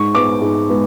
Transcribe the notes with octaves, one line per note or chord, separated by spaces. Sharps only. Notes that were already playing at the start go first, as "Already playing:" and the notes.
Already playing: G#2 C#6
G#3 B3 D6
G#2
G#3 B3